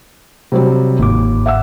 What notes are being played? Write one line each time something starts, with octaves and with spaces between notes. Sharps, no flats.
C3 F#3 G3
G1 D#2 G#2 D6
E5 F#5 E6